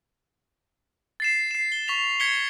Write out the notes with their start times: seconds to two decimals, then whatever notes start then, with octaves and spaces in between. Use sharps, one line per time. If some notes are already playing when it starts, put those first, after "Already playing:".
1.20 A6 C7 E7
1.51 C7 E7
1.72 G7
1.88 C#6 B6 F7
2.20 G#6 B6 C#7 G7